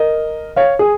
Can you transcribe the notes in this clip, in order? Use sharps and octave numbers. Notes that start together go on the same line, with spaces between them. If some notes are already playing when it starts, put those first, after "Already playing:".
Already playing: A#4 D#5
C#5 F5
G#4